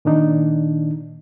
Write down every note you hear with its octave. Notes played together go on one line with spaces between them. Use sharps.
A#2 D#3 D4 D#4